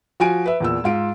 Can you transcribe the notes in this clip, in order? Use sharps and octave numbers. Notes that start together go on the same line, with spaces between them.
F3 F#4 G#5 D7
B4 E5
E2 A#2 E6
G#2 F4 D7